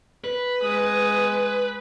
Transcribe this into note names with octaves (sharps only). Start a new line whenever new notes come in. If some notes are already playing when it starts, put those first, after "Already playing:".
B4
G#3 D#6